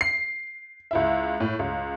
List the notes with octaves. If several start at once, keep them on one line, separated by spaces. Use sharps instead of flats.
C7
C#2 E4 E5
A2
C#2